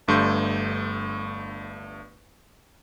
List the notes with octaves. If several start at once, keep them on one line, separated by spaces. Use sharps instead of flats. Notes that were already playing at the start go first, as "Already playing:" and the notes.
G1 G2 A3 C6 G6